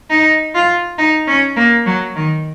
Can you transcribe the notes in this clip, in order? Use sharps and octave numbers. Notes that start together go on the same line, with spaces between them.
D#4
F4
D#4
C#4
A#3
F#3
D#3